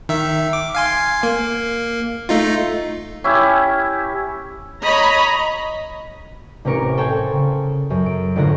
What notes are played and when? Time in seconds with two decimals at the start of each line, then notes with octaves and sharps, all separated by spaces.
0.09 D#3 E5
0.53 D6
0.75 F5 G#5 C6
1.23 A#3
2.29 A3 D#4 F4
3.24 C#4 E4 G4
4.84 C#5 D#5 A#5 B5
6.65 A1 C3 C#4 A#4 C#7 D7
6.97 A4 C5 C#5 G5 G#5
7.33 C#3
7.90 F#2
8.06 D7
8.36 G#1 A2 D3 F4 F#6 A#6